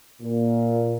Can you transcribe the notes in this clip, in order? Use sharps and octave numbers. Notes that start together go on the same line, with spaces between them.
A#2